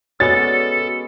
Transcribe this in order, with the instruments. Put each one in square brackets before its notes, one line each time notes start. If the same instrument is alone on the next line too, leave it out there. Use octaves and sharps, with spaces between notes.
[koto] G#3 B3 C#4 [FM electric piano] F#4 C#5 D5 [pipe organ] A4 [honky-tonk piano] A6